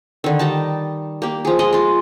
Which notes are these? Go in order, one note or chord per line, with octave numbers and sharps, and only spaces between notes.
D3 D#3
G3 D#4 A5
A#3 G4
F3 G#4
G#3 G#4 D#5
G#3 F4